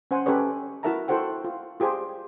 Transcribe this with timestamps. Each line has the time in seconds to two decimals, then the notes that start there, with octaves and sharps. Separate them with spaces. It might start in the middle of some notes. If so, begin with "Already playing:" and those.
0.11 C#4 C5 F#5 G#5
0.25 C#4 G4 A4 B4 C#5 D#5
0.83 E4 F#4 A#4 E5 A5 A#5
1.08 E4 F#4 A4 C5 F#5 G5
1.44 F4
1.80 F4 G4 G#4 C5 G#5